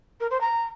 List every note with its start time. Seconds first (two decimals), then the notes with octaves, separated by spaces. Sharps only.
0.20 A#4
0.30 C5
0.40 A#5